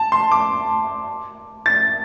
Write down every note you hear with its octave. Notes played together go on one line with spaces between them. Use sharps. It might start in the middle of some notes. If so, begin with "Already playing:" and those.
Already playing: A5
C6
D6
A6